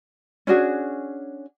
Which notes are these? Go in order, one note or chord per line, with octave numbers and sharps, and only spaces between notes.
C#4 D4 F#4 G#4